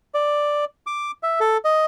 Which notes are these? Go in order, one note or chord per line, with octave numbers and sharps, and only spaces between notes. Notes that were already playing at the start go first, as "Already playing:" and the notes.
D5
D6
E5
A4
D#5